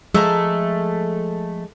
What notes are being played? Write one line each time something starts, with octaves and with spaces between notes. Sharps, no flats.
F3 G#3 A3 E5 A#5